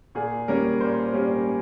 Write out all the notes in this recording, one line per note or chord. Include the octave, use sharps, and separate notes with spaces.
A#2 G#4
G3 A#3 C#4 A#4
A#2 C5
G3 A#3 C#4